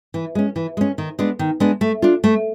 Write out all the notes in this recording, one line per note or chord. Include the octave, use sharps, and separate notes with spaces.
E3
G#3 C#4
E3
G#3 C#4
D#3
G#3 B3 D4
D#3
G#3 B3 D4
A3
D4 F4
A3